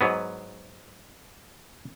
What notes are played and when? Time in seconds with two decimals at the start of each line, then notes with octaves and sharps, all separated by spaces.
0.01 G#2 F#3 B3